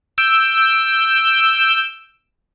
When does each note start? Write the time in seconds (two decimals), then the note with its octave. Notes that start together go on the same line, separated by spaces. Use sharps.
0.18 E6 G6 D7